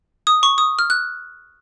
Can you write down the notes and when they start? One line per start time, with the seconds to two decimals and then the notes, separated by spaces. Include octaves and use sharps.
0.27 D#6
0.43 C#6
0.58 D#6
0.79 F6
0.90 F#6